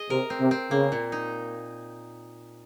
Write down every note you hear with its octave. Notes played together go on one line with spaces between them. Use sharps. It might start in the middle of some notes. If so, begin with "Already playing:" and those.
Already playing: G#4 D#5
C3 A#4
C4
C3
C4
C#3 A#3
A#2
D#4